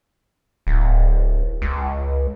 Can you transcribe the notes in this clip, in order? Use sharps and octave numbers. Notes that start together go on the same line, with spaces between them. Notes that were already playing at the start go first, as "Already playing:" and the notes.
D1
C#2